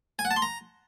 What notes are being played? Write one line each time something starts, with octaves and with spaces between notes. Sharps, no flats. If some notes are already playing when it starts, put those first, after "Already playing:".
G#5
F#5
A5
C6
A#5